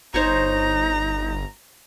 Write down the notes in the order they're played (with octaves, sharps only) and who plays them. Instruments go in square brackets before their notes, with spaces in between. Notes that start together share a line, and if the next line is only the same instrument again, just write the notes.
[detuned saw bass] G1 [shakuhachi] D#4 [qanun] C5 C#5 C#6 [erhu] A#5